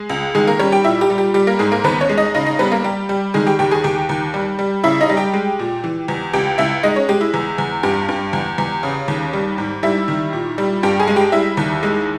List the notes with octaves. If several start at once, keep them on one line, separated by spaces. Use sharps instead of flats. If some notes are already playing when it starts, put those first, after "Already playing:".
Already playing: G#3 G#4
C#2
D#3 G#3 G#4
A#3 A#4
G3 C#4 C#5
G4 G5
A#2 E4 E5
G4
G3
G4
G3 G4
A#3 A#4
G#2 G#3 G#4
A#3 A#4
D#2 B3 B4
C#4 C#5
G#3
D#4 D#5
C#3 D#4 D#5
D#4 D#5
G3 B3 B4
A#3 A#4
G3 G4
G3
D#3 G#3 G#4
G4 G5
D#2 G4 G5
G#4 G#5
D#2 G4 G5
D#2
G3
G3
C#3 E4 E5
D#4 D#5
G3
G4 G5
G#3
A#2
E3
E2
C#2 G4 G5
C#2 E4 E5
G#3 D#4 D#5
C#4 C#5
G#3 G4
E4
E2
E2
G2 G4
G2
E2
E2
C#3
D#2
G3
G#2
G3 E4 E5
D#3
A#2
G3
G2 G4 G5
G#4 G#5
G#3
G4 G5
G3 E4 E5
D#2
G#3